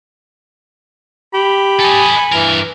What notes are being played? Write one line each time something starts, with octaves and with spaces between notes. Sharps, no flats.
G4 B5
A4 D#5 G#5
G2 E3 A#4